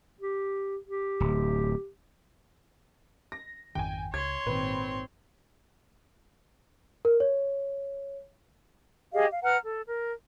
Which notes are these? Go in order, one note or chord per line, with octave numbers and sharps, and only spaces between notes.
G4
G4
D1
A#6
G#1 F2 D#3 G5 G#5
C#2 C#5 C6 G#6
G#1 A#2 D#3 C4 B4
A#4
C#5
G4 G#4 D#5 F5
F5
B4 F#5 A#5 F6
A4
A#4